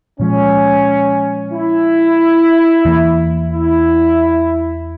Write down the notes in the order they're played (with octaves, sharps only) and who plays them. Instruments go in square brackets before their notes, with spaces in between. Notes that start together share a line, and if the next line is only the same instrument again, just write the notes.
[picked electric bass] A#2 F3 G#3 [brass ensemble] C#4
[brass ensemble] E4
[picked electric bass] E2 E3 A#3
[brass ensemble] E4